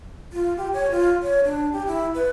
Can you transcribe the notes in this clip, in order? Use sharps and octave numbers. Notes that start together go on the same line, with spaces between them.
F4
G4
C#5
F4
C#5
D4
G4
E4
B4